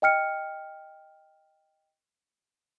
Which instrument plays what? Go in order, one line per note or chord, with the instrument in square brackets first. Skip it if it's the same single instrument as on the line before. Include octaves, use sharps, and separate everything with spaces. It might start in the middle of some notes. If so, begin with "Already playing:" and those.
[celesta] D#5 G5 F6 C#7